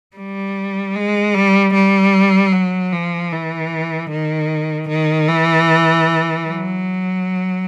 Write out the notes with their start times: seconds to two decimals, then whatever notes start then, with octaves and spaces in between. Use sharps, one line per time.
0.16 G3
0.95 G#3
1.34 G3
1.74 G3
2.53 F#3
2.92 F3
3.32 E3
4.11 D#3
4.89 D#3
5.28 E3
6.47 F#3